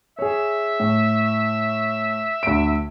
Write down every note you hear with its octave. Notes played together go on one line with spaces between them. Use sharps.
G#4 C#5 E5
A2
D2 D7